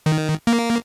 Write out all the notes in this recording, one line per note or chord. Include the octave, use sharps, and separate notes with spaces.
D#3
A#3